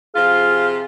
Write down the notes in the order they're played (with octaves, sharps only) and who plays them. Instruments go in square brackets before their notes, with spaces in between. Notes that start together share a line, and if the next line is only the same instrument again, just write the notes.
[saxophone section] C3 F3 F4 [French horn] G#4 [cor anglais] F5